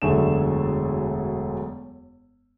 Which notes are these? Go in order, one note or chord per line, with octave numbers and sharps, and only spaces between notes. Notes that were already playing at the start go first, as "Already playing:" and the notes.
E1 F#2 D3 A3 G#4 E7